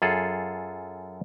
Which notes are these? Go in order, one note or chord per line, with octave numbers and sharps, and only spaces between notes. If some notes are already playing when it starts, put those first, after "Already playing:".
F#2 F4 G#4 A4